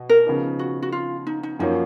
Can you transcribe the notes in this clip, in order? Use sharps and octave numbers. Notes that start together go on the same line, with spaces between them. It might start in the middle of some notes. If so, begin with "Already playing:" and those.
Already playing: B2
A#4
C#3 F3 B3 D#4
F#4
F#4
F4
D#4
D#4
F#2 F3 A#3 C#4 D#4